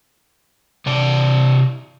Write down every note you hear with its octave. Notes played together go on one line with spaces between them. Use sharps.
C3 D5 A5